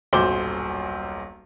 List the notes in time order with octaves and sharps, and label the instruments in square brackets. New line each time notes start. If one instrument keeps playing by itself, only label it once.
[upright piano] D#1 B1 F#2 C5 D6 G7